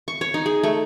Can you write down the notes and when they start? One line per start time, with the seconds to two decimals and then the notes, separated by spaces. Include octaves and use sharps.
0.08 C#6
0.21 C#5
0.34 D#4
0.46 G#4
0.63 A3